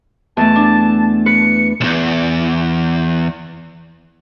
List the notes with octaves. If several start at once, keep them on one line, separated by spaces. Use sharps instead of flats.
E2 A3 A5
D4
B4 C#7
B1 E2